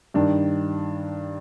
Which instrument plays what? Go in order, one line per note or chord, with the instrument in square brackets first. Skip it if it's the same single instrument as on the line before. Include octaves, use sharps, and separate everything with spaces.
[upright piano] G2 D#3 D4